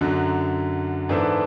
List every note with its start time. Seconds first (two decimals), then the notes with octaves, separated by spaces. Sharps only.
0.01 F#2 D3 F#3
1.09 G#2 E3 B3 D4 A4